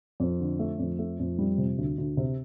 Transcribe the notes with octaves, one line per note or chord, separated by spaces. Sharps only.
F2
D3
A3
F2
A3
F2
G3
C3
D2
D2
C3